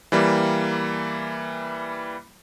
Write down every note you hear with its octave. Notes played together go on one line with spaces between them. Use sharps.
E3 G3 A#3